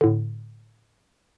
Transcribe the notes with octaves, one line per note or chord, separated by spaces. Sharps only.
A2 D3